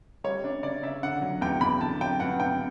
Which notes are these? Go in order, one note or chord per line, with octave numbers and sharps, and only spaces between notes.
G3 C#5
D4
C#3 D5
C#3 E5
D3 F#5
F#3
E2 G5
E2 B5
D3 A5
F#3 G5
G2 F#5
G2 G5